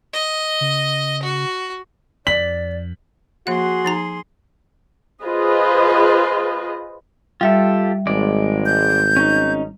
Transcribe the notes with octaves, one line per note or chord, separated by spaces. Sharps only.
D#5
C#3
F#4
F2 D5 B6 F#7
F3 A#3 F#4 G#4 F#5 C6
F3 D#4 A#5
F4 G#4 B4 C5 D#5
G3 F4 G4 A4 E5
G#1 G#3 D5
G6
C#4 D#4